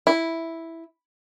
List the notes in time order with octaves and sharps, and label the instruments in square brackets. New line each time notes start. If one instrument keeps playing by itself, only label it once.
[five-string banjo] E4